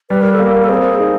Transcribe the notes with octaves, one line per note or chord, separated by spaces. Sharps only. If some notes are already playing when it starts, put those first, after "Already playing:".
G3 B4
A#4
A4
A#3 A#4
A4
C4 G#4
D#4 G#4